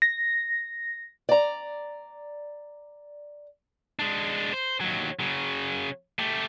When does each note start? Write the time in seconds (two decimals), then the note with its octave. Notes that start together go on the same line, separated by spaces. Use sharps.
0.02 A#6
1.29 D5 A#5
3.99 G#3 D4
4.53 C5
4.81 D#2 F#3
5.20 C#3 F#3
6.19 A3 G4